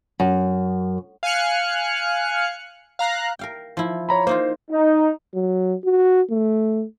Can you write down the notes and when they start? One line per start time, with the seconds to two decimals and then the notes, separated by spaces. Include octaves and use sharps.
0.20 F#2
1.23 F5 G#5 F6 F#6 C#7
2.99 F5 A#5 F#6
3.39 A#4 F5 G5
3.77 F3 E4
4.09 C#5 A#5 B5
4.27 A#3 D#4 F4 C5
4.71 D#4
5.34 F#3
5.85 F#4
6.31 A3